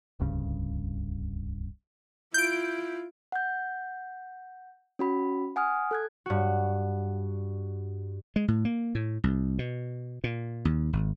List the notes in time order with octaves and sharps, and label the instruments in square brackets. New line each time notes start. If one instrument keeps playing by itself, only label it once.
[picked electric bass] D1 C2 G2 C#3
[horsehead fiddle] E4 F4 [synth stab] G6 D7
[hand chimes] F#5 G6
C#4 F#4 B5
F#5 G#5 D#6 F6
A4 F#6 G#6
[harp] G2 F#4
[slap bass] G#3
A2
A#3
A2
C2
B2
A#2
D#2
G#1